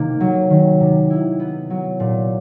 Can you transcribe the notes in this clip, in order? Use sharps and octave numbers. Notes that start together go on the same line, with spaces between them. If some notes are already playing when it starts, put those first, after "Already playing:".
Already playing: C3 D#3 A#3
F#3
D#3
C3
E4
B3
F#3
A#2